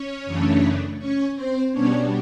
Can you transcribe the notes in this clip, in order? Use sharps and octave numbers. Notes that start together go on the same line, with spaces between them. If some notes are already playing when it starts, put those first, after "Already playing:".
Already playing: C#4 C#5
F#2 C#3 E3 A3 D4
C#4 C#5
C4 C5
B2 G3 B3 C#4 D4 C#5